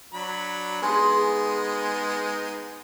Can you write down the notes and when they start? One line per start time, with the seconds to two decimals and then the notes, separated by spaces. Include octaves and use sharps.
0.13 F#3 D4 B5
0.82 G#3 B3 D#4 G#4 C5